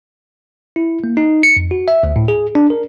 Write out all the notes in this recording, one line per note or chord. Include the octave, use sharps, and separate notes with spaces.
E4
A#3
D#4
C#7
F2
F#4
E5
D2
A2
G#4
D4
A#4